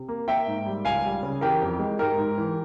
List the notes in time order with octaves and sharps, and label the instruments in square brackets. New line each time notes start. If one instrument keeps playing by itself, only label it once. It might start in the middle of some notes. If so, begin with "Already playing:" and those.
Already playing: [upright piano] C3
A#3
A#3 E5 G5
G#2
G3
C#2 F5 G#5
G3
C#3
E3 G4 A#4
F2
G#3
G#2 G4 A#4
G#2
E3